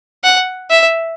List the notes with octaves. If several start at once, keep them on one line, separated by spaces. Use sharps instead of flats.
F#5
E5